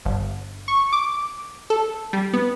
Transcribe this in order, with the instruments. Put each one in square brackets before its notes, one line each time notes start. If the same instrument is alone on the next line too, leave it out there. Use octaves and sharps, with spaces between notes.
[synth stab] G1
C#6
D6
A4
G3
B3